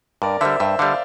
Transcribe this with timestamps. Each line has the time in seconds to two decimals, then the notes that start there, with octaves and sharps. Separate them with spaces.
0.22 G2 A#4 D5
0.41 D3 G3 C5 E5
0.59 G2 C5 E5
0.79 D3 G3 D5 F5